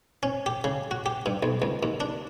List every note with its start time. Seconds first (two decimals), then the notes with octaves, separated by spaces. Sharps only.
0.23 C#4
0.46 G4
0.64 C#3
0.91 F#4
1.06 G4
1.26 G2
1.43 B1
1.62 C#2
1.83 D#2
2.00 D4